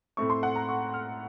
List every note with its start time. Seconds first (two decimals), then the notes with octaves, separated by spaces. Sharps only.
0.17 A2 A3 C4 C#6
0.30 C6
0.43 F#5
0.56 A#5
0.69 C#6
0.94 F6